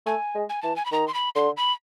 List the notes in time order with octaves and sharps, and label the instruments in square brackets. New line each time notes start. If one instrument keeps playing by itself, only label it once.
[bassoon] A3 [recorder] G#5
[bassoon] G#3
[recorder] G#5
[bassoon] E3 [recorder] A5
[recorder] G#5
B5
[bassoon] D#3 [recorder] A#5
[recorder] C6
B5
[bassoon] D3 [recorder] C6
[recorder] B5